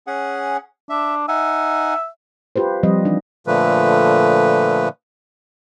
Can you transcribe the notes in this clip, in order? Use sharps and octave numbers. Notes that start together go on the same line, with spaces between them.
C#4 G#4 F#5
D4 E5
D#4 E5 F#5 G#5
F4 G4 B4 C5
F3 G3 C4 D#5
E3 D4 D#4
A#2 D3 F3 A3 B4